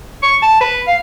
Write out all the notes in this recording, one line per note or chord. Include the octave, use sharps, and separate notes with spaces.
C#6
A5
B4
F5